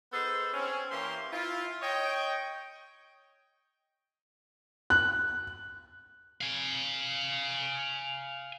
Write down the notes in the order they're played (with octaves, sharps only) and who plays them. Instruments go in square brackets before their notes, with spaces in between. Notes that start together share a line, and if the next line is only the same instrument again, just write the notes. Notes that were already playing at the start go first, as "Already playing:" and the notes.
[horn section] B3 D#4 G#4 A4 C5
C4 C#4
E3 A#3 C#4 G4 C5 C6
E4 F4
C#5 D#5 G5
[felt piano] F#6
[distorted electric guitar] F5 G#5